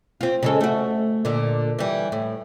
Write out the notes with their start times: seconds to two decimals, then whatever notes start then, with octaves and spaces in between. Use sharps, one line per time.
0.21 C4 F4
0.43 C#3 G#3 A4
0.61 A3 F#4
1.25 A#2 D3
1.79 E3 G3
2.12 A2